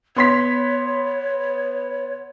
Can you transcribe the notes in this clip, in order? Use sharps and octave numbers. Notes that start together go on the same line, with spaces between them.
B3 C#5 C6 B6